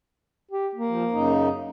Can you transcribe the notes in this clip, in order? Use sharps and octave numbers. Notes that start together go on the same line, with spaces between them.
G4
A#3
F3
F#2 C#3 D#4